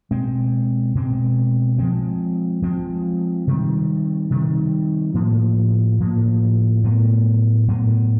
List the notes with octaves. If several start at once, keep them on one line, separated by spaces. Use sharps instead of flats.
B2 G#3 C4
B2 G#3 C4
F3 G#3 C4
F3 G#3 C4
C3 D#3 G3
C3 D#3 G3
A2 F3 A#3
A2 F3 A#3
A2 F#3 B3
A2 F#3 B3